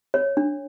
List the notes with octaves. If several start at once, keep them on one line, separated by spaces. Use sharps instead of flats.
C#5
D4